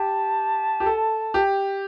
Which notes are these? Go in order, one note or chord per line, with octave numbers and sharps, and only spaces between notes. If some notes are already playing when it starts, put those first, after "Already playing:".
Already playing: G4 A5
G4
A4
G4